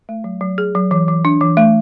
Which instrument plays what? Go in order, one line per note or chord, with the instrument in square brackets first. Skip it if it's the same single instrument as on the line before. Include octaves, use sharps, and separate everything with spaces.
[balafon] A3
F#3
F#3
G#4
F#3
E3
E3
D4
E3
A3